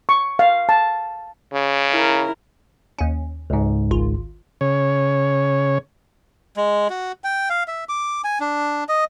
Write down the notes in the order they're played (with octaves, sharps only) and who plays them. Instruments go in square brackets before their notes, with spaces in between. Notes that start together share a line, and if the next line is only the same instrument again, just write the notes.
[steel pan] C#6
F5
A5
[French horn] C#3
[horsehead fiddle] E4 A#4
[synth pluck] D#2 C#4
[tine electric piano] C#2 G#2
[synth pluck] G#1 F4
[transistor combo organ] C#3 C#5
[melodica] G#3
F#4
G5
F5
E5
D6
G#5
D4
D#5